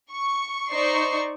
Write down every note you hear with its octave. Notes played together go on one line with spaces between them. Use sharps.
C#6
D#4 C5 D5 C#6 C7